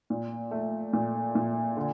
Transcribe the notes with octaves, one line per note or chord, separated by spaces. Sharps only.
A#2
A3
A#2
A#2
D3